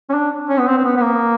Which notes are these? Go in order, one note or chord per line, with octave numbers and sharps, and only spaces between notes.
C#4
D4
C#4
B3
C4
C4
B3
B3
A#3